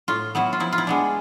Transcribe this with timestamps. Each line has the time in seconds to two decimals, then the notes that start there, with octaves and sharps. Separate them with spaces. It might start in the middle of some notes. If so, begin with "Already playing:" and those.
0.08 A2 F4
0.35 F#3 B3 E4
0.53 F4
0.60 F3 E4
0.73 F4
0.78 E4
0.87 G#3 B3 D4